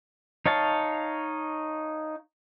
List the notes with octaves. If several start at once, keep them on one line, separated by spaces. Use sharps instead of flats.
D#4 C#5 F5 A5